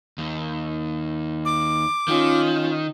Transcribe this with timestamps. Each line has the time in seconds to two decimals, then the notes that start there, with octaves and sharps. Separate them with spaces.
0.18 D#2
1.45 D6
2.08 D#3 C#4 F4